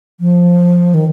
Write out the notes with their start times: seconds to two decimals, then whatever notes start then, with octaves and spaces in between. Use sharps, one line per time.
0.20 F3
0.94 D#3